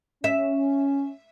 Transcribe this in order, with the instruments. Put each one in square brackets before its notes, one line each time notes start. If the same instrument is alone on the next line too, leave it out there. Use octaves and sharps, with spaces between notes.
[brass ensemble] C#4 [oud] E5